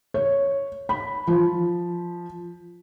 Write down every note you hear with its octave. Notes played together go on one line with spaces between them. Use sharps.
C#5
B5
F3